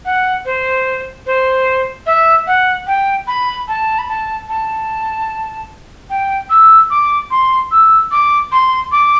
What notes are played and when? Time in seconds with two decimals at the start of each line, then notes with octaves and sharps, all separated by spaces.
0.05 F#5
0.45 C5
1.26 C5
2.06 E5
2.47 F#5
2.87 G5
3.27 B5
3.68 A5
3.99 B5
4.09 A5
4.49 A5
6.10 G5
6.50 E6
6.90 D6
7.31 C6
7.71 E6
8.11 D6
8.52 C6
8.92 D6